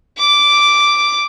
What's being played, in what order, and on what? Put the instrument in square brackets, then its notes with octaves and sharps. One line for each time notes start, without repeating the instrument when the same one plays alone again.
[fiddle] D6